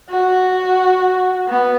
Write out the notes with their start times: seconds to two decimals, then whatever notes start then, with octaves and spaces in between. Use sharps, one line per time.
0.10 F#4
1.48 B3